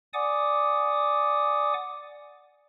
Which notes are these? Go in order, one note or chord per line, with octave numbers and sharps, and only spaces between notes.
D5 F#5 G#5 D6 D#6